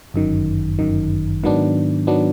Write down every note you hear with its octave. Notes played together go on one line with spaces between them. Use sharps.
G1 F#2 D#3
G1 F#2 D#3
G#2 D#3 F#3 B3 D4
D#3 F#3 B3 D4